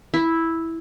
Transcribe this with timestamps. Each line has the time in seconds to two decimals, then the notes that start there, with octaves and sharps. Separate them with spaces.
0.14 E4